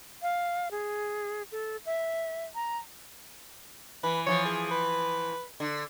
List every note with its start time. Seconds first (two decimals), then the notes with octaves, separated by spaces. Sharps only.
0.22 F5
0.71 G#4
1.52 A4
1.86 E5
2.55 A#5
4.03 E3 B4
4.26 E3 F3 C#5
4.45 G#4
4.71 B4
5.60 D3